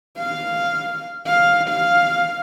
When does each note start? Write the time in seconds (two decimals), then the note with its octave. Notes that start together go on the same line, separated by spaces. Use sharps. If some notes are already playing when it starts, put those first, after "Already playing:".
0.18 F5
1.26 F5
1.69 F5